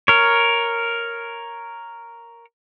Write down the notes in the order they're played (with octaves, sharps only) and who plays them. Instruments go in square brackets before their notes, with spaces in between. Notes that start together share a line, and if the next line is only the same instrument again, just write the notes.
[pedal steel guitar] A#4 C#5